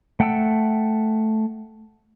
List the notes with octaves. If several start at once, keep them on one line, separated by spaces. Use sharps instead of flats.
A3 F#5 G5 A5 E6